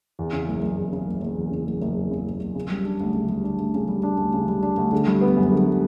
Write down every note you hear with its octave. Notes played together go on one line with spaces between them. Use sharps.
E2
C#3
F#1
F#1
E2
C#3
F#1
F#1
E2
C#3
F#1
F#1
E2
C#3
F#1
F#1
C#3
G3
D4
D2
C#3
G3
D4
D2
C#3
G3
D4
D2
C#3
G3
D4
D2
D3
G3
B3
F#2
D3
G3